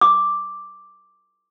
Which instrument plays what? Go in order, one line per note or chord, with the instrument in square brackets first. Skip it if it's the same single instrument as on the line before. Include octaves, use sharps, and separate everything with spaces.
[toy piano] D6